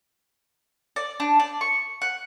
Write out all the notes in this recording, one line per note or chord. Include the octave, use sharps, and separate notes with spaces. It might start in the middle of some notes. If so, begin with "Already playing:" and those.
D5
D4
D5
C#6
F#5